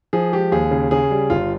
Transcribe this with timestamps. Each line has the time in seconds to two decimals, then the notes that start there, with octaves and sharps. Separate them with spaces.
0.13 F3 G#4
0.33 G#3 G4
0.52 D#2 G#4
0.71 C#3
0.91 C#3 G#4
1.11 G3
1.30 G1 F4